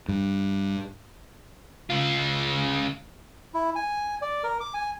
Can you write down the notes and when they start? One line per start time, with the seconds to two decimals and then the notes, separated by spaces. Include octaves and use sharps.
0.08 G2
1.90 C#3 F4
3.54 E4
3.75 G#5
4.22 D5
4.44 A#4
4.60 D6
4.74 G#5